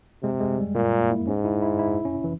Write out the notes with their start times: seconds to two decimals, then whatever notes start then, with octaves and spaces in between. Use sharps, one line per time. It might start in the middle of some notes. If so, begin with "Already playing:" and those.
0.23 C3 G#3
0.40 G#3
0.58 G3
0.75 A#2 A#3
1.11 E4
1.27 G#2 C#4
1.45 E4
1.62 E4
1.79 E4
2.05 C#4
2.24 E3